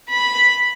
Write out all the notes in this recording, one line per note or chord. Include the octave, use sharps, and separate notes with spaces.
B5